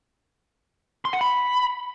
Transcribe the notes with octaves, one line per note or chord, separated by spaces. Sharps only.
C6
F#5
B5